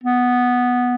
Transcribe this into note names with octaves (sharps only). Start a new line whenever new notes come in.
B3